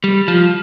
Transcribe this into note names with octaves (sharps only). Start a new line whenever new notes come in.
G3
F3